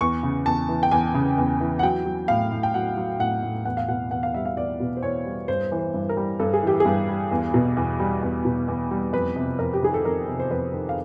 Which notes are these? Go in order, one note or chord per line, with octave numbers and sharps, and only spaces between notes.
E2 C#6
C#3
E2 A5
E3
G5
E2 G#5
C#3
E2
E3
F#5
F#3 G5
F#3
A2 F5
A2
G5
F#3 F#5
F#3
A2 F#5
A2
E2 F#5
F5
B2 F#5
E2 F#5
F5
G3 E5
F5
E2 D5
B2
C5
E2 C#5
G3
G2 C5
E3
C5
G2
A#4
G3
G2 A4
G#4
E3 G4
G#4
G2
G3
E2
B2
E2
G3
E2
B2
E2
G3
F2 B4
C3
F2 A#4
G4
D#3 G#4
A4
F2 A#4
C3
C5
F2 B4
D#3
F5